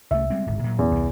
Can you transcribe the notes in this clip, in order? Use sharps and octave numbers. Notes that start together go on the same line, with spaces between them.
C2 A3 E5
G3 G#3 C4
D1 G#1 G#2
A#2 F#3
E2
C2 E3